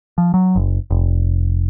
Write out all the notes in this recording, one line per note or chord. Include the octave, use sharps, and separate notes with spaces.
F3
F#3
F#1
F1